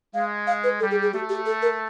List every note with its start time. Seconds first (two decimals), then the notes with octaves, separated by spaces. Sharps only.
0.14 G#3 F5
0.47 F5
0.64 B4
0.80 G3 A4
0.91 G#4
1.02 G#4
1.13 A3 G4
1.29 G4
1.46 A4
1.62 A#4